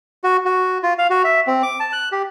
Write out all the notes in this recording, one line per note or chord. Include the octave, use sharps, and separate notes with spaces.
F#4
F#4
F4
F5
F#4
E5
C4
D6
A5
F#6
G4